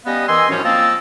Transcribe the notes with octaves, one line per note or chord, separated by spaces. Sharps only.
G3 B3 C#4 B4 D#5 F5
D#3 E3 D#5 G#5 C6 E6
F#2 A2 F3 G3 C#4
F3 A#3 C4 D#5 A5 E6